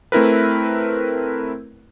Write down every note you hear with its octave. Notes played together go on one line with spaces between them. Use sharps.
A3 C4 E4 A#4 B4